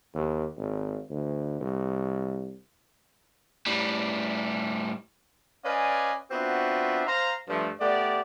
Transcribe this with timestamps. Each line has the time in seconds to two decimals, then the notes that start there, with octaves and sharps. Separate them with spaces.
0.14 D#2
0.58 G#1
1.10 D2
1.61 C2
3.67 A2 G3
5.65 C#4 B4 D5 D#5 F5 G#5
6.31 B3 C4 D4 F4 F#4 E5
7.06 C5 F5 A#5
7.48 G2 F3 A3
7.80 A3 B3 G4 D5